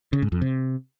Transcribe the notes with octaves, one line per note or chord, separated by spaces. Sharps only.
C#3
G#2
F2
C3